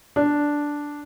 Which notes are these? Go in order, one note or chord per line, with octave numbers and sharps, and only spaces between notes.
D4